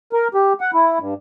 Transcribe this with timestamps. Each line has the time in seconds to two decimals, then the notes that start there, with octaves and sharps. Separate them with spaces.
0.13 A#4
0.34 G4
0.61 F#5
0.73 E4
0.99 G2